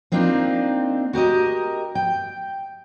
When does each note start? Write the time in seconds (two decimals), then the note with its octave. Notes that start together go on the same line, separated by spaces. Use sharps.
0.12 A#3 C4 D4 D#4 F4
1.13 F#4 G4 A#4 D#5
1.95 G5